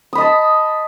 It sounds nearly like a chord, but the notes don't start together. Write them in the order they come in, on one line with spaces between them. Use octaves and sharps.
D#6 B5 D#5 A5